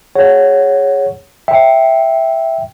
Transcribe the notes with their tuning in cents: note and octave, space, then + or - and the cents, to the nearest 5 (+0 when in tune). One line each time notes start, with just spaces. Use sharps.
G#4 -10 C#5 +0 F#5 +0
E5 +0 G5 +0